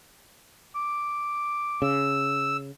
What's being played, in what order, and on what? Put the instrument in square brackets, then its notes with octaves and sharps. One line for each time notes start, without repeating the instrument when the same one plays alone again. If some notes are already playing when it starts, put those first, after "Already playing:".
[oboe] D6
[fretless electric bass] C#3 [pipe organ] E6